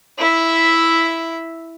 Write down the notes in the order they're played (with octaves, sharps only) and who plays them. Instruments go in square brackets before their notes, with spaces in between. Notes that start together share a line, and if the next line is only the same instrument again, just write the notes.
[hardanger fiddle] E4 E5